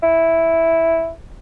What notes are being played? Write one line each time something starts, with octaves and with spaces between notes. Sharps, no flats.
E4